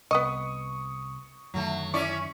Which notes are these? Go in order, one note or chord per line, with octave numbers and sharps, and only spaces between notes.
C2 B3 D#5 C#6 D#6
F#2 D3 D#3 F#3 A3
C#4 E4 D5 C#6